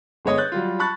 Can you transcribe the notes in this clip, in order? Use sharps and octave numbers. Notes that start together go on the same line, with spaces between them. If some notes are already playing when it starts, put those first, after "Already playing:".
G1 G#3 B3 C#5 D#5 D#6
F#6 G6 A6
F#3 G3 F4
A5 B5 C#6 F#6 A6